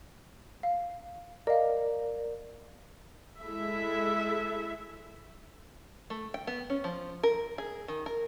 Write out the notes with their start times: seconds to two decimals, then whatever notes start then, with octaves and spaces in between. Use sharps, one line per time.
0.63 F5
1.47 A#4 D5 D#5 F5
3.42 G#3 E4 A4 E5
6.10 A3
6.34 G5
6.47 B3
6.70 C#4
6.84 F3
7.23 A#4
7.58 G#4
7.88 D#3
8.06 A#4